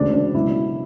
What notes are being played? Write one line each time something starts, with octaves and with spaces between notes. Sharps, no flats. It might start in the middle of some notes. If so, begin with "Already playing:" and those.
Already playing: E1 D2 C#3 D4
D4
C#2 B2 F#3 E4